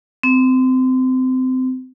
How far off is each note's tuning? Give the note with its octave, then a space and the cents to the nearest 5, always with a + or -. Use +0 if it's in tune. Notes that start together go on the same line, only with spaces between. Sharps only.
C4 -25